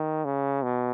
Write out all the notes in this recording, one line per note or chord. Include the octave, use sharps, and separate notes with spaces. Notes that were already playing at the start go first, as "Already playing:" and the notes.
Already playing: D#3
C#3
B2